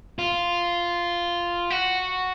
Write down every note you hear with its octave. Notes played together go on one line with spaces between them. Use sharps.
F4
F#4